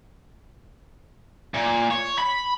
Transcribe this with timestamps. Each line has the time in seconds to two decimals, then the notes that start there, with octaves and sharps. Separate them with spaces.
1.54 A#2
1.91 C#5
2.18 B5